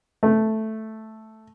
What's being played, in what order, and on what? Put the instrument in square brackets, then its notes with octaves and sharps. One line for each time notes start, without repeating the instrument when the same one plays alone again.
[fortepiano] A3